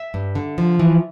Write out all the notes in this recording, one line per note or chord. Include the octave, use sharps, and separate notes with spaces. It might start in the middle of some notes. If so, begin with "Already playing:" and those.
Already playing: E5
G2
D3
F3
E3